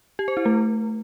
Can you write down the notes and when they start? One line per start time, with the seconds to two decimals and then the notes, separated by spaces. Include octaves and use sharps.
0.19 G4
0.28 C5
0.37 E4
0.46 A3